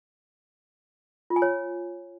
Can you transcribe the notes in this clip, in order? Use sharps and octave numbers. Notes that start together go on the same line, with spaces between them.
F4
G#5
C#5